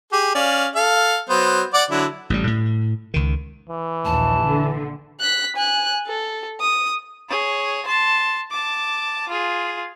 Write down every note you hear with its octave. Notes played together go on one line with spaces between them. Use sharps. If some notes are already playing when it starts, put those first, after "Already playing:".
G4 G#4
C#4 D5 F5
A4 F5
F#3 B3 C5
D5 F#5 D6
D3 F#3 E4
A1 A2 F3 G3
A2
C#2 D#3
E3
A#1 D#2 A5
D3
F#6 B6
G#5 F#6
A4
D#6
G#4 C#5
A5 C6
A5 D6
F4 G#4